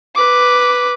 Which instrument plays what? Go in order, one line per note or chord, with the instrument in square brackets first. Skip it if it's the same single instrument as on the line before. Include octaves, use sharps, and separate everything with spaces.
[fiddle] B4 D6